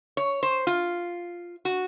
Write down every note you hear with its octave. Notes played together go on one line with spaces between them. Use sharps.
C#5
C5
F4
F#4